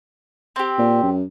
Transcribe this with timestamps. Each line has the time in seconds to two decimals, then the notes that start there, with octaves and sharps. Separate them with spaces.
0.56 C4 G4
0.79 A#2
1.03 F#2